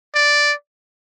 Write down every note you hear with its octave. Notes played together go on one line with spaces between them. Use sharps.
D5